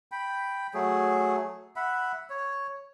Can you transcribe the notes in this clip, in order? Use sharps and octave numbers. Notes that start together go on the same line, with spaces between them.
G5 B5
F#3 A3 G#4
E5 F#5 B5
C#5